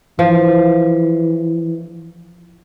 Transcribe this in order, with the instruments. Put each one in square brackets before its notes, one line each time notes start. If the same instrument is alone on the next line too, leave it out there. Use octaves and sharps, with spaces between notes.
[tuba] E3 [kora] F3